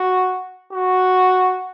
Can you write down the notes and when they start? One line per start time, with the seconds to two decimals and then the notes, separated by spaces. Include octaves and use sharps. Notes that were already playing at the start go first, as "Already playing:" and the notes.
Already playing: F#4
0.73 F#4